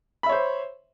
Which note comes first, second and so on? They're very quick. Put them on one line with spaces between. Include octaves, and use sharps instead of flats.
B5 E5 C#5 C5